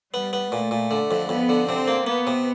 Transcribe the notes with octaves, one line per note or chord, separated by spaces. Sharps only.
G3 B3
B3
A#2 A3
A#2
D3
F2
F2 B3
D3
C3 C4
A#3
A#3 B3
C3